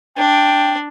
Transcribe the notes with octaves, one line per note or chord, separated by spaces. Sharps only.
D4 G5